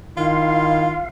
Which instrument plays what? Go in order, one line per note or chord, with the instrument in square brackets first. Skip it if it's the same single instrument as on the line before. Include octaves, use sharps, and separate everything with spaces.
[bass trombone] D#3 [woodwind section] E4 C6 [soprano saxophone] F4 [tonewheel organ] F5